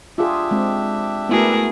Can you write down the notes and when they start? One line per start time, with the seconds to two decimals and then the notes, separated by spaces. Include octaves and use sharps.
0.18 D4 F4 G4 G#4 E5
0.51 G#3 C4
1.29 A3 B3 E4 F#4 G#4 A#4